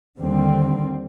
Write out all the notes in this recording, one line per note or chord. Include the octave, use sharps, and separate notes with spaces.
D#2 D3 G3 C4